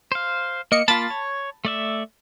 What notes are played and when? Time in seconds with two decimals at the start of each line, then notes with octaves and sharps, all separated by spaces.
0.12 C5 F5
0.72 A#3 D#5 C#7
0.88 A#3 F4 A5 B5 A6
1.10 C#5
1.65 A3 D5 E5